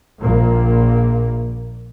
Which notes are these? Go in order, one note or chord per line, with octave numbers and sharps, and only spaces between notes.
A#1 A#2 A#3